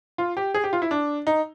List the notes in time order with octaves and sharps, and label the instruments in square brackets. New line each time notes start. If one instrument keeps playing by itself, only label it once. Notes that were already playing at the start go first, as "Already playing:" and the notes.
[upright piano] F4
G4
G#4
G4
F4
E4
D4
D#4